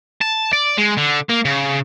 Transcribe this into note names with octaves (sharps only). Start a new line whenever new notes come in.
A5
D5
G#3
D3
A#3
C#3